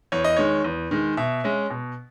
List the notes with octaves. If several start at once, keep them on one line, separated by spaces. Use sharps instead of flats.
E2 C#5
D#5
D#3 G#3 C#5
E2
D#3 G#3
B2 E5
G#3 C#4
B2